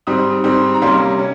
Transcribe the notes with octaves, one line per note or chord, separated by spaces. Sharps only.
G#2 G3 C4 D#6
G#2 G3 C4
A#5
C3 G3 A#3 C#4 C6
C#4